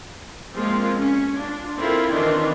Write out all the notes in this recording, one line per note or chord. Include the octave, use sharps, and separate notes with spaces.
F3 G#3 A#3 C4 F4 A#4
C#4
D4 F4
C4 E4 F4 A4 A#4
D#3 E3 C4 D4 D#4 F4